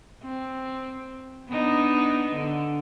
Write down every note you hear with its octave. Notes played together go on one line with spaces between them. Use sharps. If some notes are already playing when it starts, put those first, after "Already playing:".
C4
B3 D4 D#4
D3